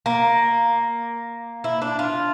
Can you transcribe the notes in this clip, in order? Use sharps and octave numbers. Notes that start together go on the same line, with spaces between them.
A#3
E4
D4
F4